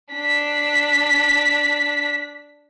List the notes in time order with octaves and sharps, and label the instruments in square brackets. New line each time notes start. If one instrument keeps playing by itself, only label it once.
[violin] D4 B6